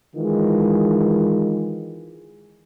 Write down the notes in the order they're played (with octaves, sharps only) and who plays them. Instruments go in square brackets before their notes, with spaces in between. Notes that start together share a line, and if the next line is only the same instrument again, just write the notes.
[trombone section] D#3 E3 G#3 F4